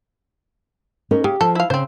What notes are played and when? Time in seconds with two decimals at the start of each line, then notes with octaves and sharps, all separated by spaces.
1.11 C#4 D#4 A#4
1.24 C#3 G4
1.41 F3 A4
1.55 E4 F5
1.70 C#3 C4 C5